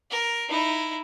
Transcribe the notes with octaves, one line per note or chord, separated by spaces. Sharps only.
A#4
D#4 E4